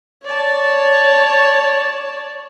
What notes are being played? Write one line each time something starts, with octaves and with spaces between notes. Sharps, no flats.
C#5 D5 A5